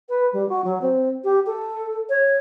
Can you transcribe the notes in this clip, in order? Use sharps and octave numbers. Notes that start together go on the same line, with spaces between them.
B4
G3
F#4
F#3
C4
G4
A4
C#5